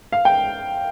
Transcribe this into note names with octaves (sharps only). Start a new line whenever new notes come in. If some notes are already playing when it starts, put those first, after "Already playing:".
F5
G5